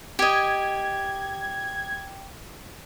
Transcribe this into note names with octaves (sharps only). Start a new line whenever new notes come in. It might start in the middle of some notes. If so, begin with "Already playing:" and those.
G4 D#5 G#6